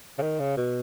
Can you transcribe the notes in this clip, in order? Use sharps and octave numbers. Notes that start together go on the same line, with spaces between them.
C#3
D#3
C#3
B2